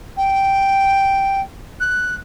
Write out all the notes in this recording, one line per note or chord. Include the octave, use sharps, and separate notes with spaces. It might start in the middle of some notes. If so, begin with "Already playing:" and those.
G5
F#6